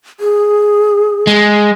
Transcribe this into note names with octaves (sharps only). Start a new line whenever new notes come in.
G#4
G#3